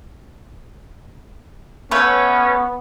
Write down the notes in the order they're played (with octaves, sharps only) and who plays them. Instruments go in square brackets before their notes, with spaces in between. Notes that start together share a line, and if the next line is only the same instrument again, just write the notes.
[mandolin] A3 B4 C#5 [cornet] B3 [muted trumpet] C#4 [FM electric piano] C#6